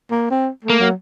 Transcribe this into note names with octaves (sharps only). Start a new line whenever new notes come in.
A#3
C4
A3 A#3
F#3